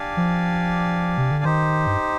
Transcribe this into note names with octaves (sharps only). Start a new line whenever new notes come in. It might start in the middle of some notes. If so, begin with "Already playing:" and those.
Already playing: D4 G4 D5 F5 G#5
F3
C3
D3
D#3 D#4 G4 C5
G2